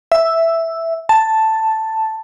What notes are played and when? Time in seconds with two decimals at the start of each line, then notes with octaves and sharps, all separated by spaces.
0.12 E5
1.09 A5